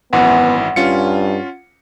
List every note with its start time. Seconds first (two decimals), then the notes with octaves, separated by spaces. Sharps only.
0.13 G#1 F#2 E3 B3 F#5
0.76 G2 C#4 F4 C#7